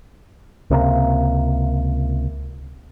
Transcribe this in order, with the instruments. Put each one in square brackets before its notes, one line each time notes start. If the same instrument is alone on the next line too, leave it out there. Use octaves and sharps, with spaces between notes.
[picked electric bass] C#2 C3 G#3 A#3